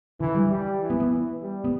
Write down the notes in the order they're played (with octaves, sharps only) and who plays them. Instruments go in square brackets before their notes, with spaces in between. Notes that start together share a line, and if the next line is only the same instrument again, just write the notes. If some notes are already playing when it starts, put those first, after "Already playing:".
[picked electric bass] D3 [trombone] E3
[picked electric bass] G3
[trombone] G3
E3
[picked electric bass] B3
B3
[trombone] E3
G3
[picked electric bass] B3